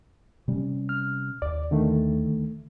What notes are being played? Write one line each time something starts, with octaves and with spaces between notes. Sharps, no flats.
C3 G3 C#4
F6
D#2 D5
D3 D#3 A3